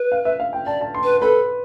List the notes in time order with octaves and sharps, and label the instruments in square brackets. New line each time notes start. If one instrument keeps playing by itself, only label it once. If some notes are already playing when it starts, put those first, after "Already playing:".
Already playing: [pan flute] B4
[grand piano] F5
E5
F5
G5
[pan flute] D5 [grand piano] A5
[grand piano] A5
C6
[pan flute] B4
[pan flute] A4 [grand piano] B4